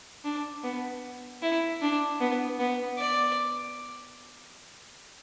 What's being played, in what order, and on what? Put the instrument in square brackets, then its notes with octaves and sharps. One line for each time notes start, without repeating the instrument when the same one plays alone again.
[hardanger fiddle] D4
B3
E4
D4
B3
B3
D5